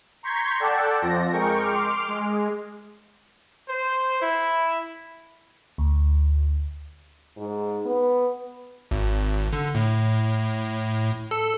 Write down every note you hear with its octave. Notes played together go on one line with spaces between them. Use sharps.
A#5 C6 C#6 G6 G#6 B6
A4 D5 F#5 G5 A5
F2 F3 A#6
G#3 A#4 G5 C#6
C6 D6 F6
G#3
C5
E4
D2
G#2
B3
G#1
D3
A2
A4